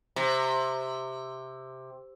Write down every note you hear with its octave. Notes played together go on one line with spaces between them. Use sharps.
C3